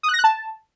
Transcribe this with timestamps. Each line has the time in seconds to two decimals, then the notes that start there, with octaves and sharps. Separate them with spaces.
0.03 D#6
0.08 F#6
0.14 A#6
0.19 F#6
0.24 A5